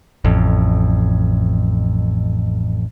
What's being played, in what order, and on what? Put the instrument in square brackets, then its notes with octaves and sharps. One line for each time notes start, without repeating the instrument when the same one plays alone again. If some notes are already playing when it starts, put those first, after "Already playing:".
[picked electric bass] A1 F2